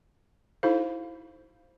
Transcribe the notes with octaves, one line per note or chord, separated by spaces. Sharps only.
D#4 E4 F#4 A4 C5 F5